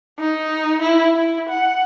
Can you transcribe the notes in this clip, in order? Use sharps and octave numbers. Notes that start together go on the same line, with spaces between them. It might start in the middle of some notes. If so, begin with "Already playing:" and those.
D#4
E4
E4
F#5